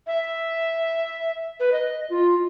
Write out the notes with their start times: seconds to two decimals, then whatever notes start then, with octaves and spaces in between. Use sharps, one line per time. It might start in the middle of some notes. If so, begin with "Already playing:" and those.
0.07 E5
1.60 B4
1.72 D#5
2.10 F4